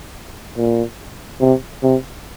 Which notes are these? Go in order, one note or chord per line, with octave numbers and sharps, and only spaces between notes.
A#2
C3
C3